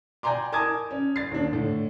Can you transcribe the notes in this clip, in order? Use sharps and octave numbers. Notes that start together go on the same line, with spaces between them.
D5 G5 G#5 A#5 C6 D6
A#4 G#5 A5 D6 D#6 G#6
C#4
A6 C7
D#2 D4
A2 D3